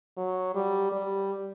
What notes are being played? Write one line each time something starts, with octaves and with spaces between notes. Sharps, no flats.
F#3
G3
G3